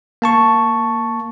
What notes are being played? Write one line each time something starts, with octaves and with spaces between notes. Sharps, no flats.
A#3 A5 C#6